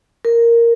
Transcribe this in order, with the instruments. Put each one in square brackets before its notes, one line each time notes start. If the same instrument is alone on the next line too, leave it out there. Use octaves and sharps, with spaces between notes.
[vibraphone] A#4